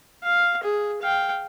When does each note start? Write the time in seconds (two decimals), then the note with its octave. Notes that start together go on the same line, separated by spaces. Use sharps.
0.24 F5
0.63 G#4
1.02 F5 G5